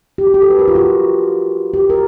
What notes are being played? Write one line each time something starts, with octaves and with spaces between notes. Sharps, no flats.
G4
F#4
G4
A4
B4
A#4
F4
F#4
G4
A#4